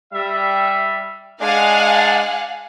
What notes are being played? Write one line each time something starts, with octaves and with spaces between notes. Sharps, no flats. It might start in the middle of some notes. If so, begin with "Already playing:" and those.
G3 E5
G#3 D4 F5 F#5 G#5